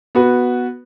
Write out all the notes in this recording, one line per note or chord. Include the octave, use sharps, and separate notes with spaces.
B3 F#4 B4